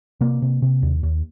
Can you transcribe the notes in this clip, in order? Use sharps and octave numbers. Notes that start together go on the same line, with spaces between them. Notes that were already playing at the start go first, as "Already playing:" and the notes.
C3 A#3
C3
C3
D#2
D#2